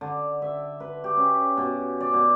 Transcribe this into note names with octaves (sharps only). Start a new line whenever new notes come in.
D3
E5
B4
G4
C#4
B2
D5
B2